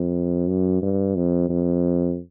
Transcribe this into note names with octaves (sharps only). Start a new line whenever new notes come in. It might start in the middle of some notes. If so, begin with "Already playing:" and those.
Already playing: F2
F#2
G2
F2
F2